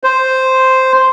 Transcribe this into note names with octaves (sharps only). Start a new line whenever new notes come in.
C5